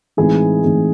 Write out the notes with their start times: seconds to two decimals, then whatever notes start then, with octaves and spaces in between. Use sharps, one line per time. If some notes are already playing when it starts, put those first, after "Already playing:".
0.17 A2 E3 G#3 C4 D#4 G#4
0.63 A2 E3 G#3 C4 D#4